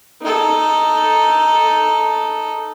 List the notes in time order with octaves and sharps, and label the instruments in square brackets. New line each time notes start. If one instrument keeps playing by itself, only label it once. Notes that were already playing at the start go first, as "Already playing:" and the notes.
[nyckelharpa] D#4 A4